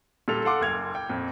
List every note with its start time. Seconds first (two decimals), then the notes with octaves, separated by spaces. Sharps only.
0.28 A#2 G3 A4 F7
0.45 A4 F5 F#5 C6 D6
0.61 F#1 G#6 F7
0.95 G5
1.09 F2 A#2